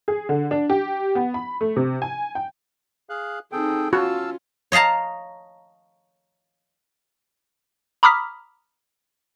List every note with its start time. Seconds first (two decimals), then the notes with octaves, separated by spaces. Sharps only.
0.08 G#4
0.29 D3
0.51 D4
0.70 G4
1.15 B3
1.34 B5
1.61 A3
1.76 C3
2.02 G#5
2.35 G5
3.10 G#4 F5 F#6
3.52 C4 D#4 G#4 A4 G5
3.93 C#4 F4 F#4 F5 A5 E6
4.72 C#5 D#5 F5 A5 A#5
8.03 A#5 B5 D6 D#6 F6 B6